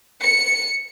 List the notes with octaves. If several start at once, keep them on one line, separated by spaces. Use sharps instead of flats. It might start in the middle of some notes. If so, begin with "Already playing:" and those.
C#7